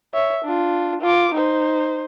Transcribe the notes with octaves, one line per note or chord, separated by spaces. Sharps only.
C#5 E5
D4 F4
F4 D6
D#4 C5